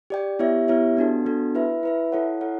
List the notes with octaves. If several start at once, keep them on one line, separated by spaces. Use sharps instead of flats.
G4 D5 G5
B3 E4 G4 C#5 E5
B3 E4 G4 C#5 E5
B3 D4 F#4 A4
B3 D4 F#4 A4
E4 B4 E5
E4 B4 E5
E4 A4 C#5 F#5
E4 A4 C#5 F#5